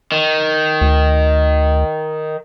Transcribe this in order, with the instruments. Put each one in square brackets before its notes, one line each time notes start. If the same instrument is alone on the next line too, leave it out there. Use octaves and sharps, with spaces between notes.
[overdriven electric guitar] D#3
[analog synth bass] D2